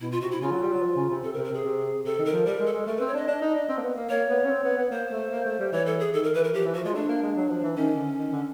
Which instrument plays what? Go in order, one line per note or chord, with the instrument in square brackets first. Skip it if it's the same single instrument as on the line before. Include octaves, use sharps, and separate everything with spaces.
[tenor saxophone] B2 [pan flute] E4
[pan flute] F4
[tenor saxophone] C3 [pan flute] F#4
[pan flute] E4
[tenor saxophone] C#3 [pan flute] F4
[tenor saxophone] F#3
G3
F#3
F3
C#3
C3
[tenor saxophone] C3 [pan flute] A4
[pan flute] A#4
[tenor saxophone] C3
[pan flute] A#4
[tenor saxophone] C3 [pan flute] G#4
[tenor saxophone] C3
[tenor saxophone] C3 [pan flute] A4
[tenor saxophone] D#3
[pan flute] A#4
[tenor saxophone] F3
[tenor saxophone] G3 [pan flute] A#4
[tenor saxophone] G#3
[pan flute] A4
[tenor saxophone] G#3
[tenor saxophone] A3 [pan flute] A#4
[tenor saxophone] C4 [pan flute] B4
[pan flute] C#5
[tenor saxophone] D4 [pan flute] D#5
[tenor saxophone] D4
D#4
D4
C4
A#3
B3
A#3
[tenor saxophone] A#3 [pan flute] C#5
[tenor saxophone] B3
C#4
C4
B3
B3
[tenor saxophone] A#3 [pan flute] C5
[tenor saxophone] A3
A#3
A3
G3
[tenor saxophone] E3 [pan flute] C#5
[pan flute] A4
G#4
[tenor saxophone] D#3 [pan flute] A4
[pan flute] A#4
[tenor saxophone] E3 [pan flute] B4
[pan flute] A#4
[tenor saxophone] F3 [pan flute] G4
[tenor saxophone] E3
[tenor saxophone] F3 [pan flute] F#4
[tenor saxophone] G#3 [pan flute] F4
[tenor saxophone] A3 [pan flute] D4
[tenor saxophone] A#3
G#3
F#3
F3
E3
[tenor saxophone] D#3 [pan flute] C#4
[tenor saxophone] D3
D#3
D3